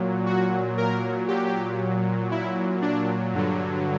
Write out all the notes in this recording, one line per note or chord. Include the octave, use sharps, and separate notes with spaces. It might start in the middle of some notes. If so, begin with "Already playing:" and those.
Already playing: A#2 F#3
F#4
A#4
A#2 F#3 G4
E4
D4
G2 D3 F#3